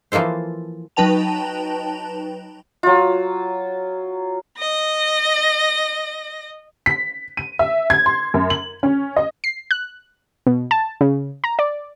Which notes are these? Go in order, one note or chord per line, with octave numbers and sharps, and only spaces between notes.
E3 F3 A#3 A4 C5
F#3 D#4 B4 G5 A5 F7
F#3 F4
D#5 A#6
B6
D#7
E5
G#6
C6
F#2
F#7
C#4
D#5
C7
F#6
B2
A5
C#3
A#5
D5